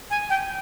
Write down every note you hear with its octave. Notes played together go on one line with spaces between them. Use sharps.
G#5
G5